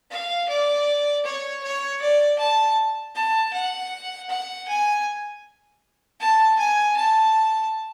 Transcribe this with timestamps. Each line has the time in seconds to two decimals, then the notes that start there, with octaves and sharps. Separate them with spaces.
0.11 F5
0.49 D5
1.25 C#5
1.63 C#5
2.01 D5
2.39 A5
3.15 A5
3.53 F#5
4.29 F#5
4.68 G#5
6.20 A5
6.59 G#5
6.96 A5